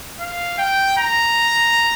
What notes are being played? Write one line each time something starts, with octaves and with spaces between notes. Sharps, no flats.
F5
G5
A#5